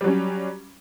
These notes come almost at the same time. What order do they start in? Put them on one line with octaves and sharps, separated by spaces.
G3 F#3 C#4